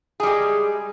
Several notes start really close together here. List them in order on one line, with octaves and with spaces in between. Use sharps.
G#4 G3 G#3